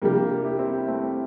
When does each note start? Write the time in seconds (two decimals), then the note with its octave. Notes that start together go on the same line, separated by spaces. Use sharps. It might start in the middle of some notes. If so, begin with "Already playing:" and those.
0.02 F2 C3 G3 A#3 D4 G4
0.16 A#3
0.30 A#3
0.45 E4 G4
0.58 C4 E4
0.88 A3 C4